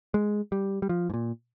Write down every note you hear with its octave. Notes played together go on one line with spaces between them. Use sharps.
G#3
G3
G3
F3
G#2
A#2